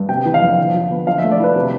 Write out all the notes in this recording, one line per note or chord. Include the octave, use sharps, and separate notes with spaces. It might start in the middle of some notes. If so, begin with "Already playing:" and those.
Already playing: G2
C3 G5
E3
F5
F2
D3
F3
B3
F3 F5
E5
A3
D5
E4 B4
C3